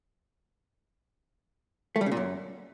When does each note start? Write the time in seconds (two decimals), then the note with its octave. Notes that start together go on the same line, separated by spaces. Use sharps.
1.96 A3
2.01 G3
2.06 C#3
2.11 A#2
2.17 F#2